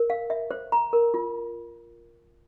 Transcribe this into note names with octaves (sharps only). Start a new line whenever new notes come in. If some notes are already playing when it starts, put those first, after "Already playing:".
Already playing: A#4
F5
E5
C5
A#5
A#4
F4